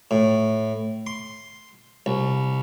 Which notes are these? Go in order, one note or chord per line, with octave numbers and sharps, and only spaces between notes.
A2
C6
C2